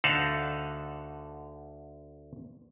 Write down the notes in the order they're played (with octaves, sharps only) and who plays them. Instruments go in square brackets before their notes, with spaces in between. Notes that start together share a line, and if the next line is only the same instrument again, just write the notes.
[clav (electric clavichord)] D2 D3 D#4 A4 F5 F#5